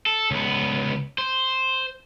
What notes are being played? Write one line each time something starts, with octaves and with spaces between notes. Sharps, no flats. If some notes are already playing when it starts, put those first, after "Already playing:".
A4
C#2 B3
C5